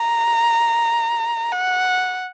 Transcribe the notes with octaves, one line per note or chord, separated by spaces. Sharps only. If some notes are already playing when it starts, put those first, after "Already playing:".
Already playing: A#5
F#5